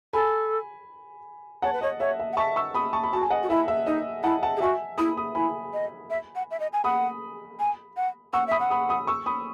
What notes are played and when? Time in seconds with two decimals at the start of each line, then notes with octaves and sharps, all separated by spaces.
0.13 A4 G#5 B5
1.62 C#5 F#5 A5
1.73 B4
1.81 C#5 D#5
2.00 C#5 E5
2.19 E5
2.33 F#5
2.37 E5 A5 C#6
2.56 C#6 E6
2.74 B5 D#6
2.93 A5 C#6
3.04 B5
3.13 F#4 A5
3.21 G#5
3.30 D#5 F#5
3.43 F#4
3.49 E4 E5
3.68 E5
3.87 D#4 D#5
4.23 E4 F#5 A5
4.43 F#5 A5
4.57 G#4
4.61 F#4 E5 G#5
4.98 E4 B5 D#6
5.17 B5 D#6
5.35 E4 G#5 B5
5.73 D#5
6.10 E5
6.35 F#5
6.51 E5
6.60 D#5
6.73 G#5
6.84 F#5 B5 D#6
7.59 G#5
7.97 F#5
8.33 F#5 C#6 E6
8.47 E5 B5 D#6
8.60 F#5
8.70 B5 D#6
8.89 B5 D#6
9.07 C#6 E6
9.26 B5 D#6